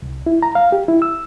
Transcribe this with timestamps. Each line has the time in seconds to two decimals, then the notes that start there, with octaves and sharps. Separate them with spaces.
0.02 C2
0.26 E4
0.43 A#5
0.55 F5
0.72 G4
0.88 E4
1.02 E6